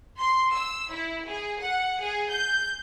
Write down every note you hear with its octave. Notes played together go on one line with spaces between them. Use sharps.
C6
E6
E4
G#4
F#5
G#4
G6